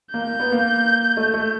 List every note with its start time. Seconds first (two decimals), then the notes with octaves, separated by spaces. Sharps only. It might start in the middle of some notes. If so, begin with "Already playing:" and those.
0.13 A#3 G6
0.27 A#3
0.40 B3
0.52 A#3
1.17 A3
1.34 A3